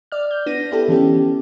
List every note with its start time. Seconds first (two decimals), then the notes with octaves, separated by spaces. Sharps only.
0.12 D5 F6
0.31 G6
0.46 B3 D4 A#6 D#7
0.71 B3 E4 G4 A4
0.88 D3 E3 B3 C#4 G4